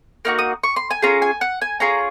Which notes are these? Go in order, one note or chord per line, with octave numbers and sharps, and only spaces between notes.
A#3 D#4 F#4 F6
D#6
C#6
C6
G#5
C#4 F4 G#4 A#5
G#5
F#5
G#5
C#4 F4 G#4 A#5